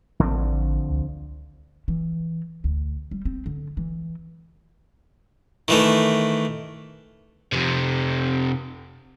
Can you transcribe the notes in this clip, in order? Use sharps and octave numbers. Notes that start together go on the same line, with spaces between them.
A1 D3 F3 C4
C#2
E3
D2
G3
C4
D3
E3
D#3 E3 A3
F2 C3